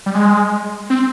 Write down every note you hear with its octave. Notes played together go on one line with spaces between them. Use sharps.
G3
G#3
C4